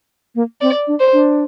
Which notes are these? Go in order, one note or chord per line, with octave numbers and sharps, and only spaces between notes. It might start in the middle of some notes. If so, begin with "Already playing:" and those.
A#3
C4 D5
D4
C5
D4